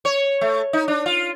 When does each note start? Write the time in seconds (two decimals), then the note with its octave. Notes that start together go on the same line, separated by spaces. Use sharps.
0.05 C#5
0.41 A3
0.73 D#4
0.88 D4
1.06 F4